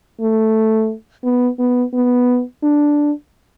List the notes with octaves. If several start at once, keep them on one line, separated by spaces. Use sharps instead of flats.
A3
B3
B3
B3
D4